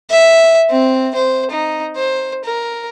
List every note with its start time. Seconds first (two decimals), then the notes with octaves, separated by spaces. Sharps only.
0.10 E5
0.70 C4
1.15 C5
1.50 D#4
1.96 C5
2.44 A#4